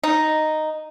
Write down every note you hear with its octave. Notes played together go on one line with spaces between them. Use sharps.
D#4